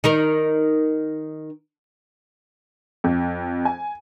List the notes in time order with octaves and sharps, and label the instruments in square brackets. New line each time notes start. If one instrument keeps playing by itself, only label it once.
[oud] D#3 D#4 A#4
[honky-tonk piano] F2
G#5